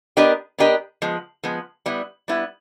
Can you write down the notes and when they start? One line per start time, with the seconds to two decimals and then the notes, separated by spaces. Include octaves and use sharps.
0.17 B3 D4 G4 A#4 D#5
0.58 B3 D4 G4 A#4 D#5
1.02 F3 G#3 B3
1.43 F3 G#3 B3
1.86 G3 B3 E4
2.28 G3 B3 E4